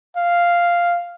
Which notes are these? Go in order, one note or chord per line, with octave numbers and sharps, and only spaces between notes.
F5